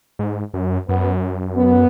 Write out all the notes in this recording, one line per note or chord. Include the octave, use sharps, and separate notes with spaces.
G#2
F#2
F#2 B3
B3